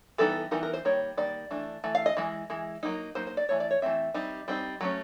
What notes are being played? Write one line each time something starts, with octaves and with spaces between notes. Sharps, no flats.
E3 G3 B3 D#4 A4
E3 G3 B3 D#4 A#4
A#4
C5
D#3 G3 A#3 C#5
D#3 G3 A#3 D5
E3 A3 D4
E3 A3
F5
D#5
E3 G#3
E3 G#3
F#3 A#3 D#4
F#3 A#3 D#4 C5
C5
D5
E3 A3 C#5
D5
C#5
E3 A3 C4 E5
G3 C4 D#4
G3 C4 D#4
F#3 A3 C#4